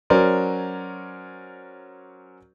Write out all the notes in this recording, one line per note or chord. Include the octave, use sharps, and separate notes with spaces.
F#3 C#4 A#4 C5 D5